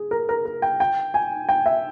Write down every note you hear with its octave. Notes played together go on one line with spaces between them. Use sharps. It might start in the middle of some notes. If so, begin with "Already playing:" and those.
Already playing: G#4
A#4
A#4
A#4
G5
G5
G#5
G5
E5